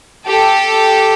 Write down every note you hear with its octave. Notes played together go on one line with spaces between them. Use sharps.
G4 A4